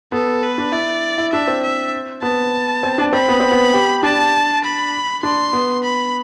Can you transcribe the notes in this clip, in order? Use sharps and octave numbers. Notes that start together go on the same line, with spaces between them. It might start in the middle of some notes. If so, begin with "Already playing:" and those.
B3 A4
B4
D4
E4 D5
E4
D4 E5
C4
E5
B3 A5
C4
D4
C4 B5
B3
C4
B3
G4
D4 A5
B5
D4 C6
B3
B5